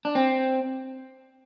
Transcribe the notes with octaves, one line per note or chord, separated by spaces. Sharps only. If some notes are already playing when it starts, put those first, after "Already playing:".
D4
C4